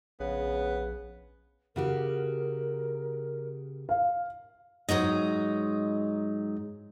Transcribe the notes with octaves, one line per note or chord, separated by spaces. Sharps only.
A#1 C#3 B3
C#3 F#4 G4 A#4
F5
G#2 F#3 D#4 D#5